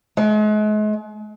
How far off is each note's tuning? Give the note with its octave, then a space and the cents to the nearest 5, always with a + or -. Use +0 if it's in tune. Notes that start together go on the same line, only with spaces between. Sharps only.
G#3 +40